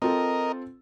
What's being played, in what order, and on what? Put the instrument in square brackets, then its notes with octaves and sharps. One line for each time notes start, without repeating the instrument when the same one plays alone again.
[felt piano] C4 F4 A4 [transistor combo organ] A#4 D#5